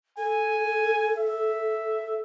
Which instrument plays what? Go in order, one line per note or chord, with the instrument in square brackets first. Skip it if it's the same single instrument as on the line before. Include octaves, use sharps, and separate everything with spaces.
[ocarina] A4 [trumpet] G#5
[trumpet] E5